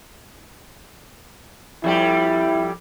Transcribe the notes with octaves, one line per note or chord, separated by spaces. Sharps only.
F2 G3 E4 G4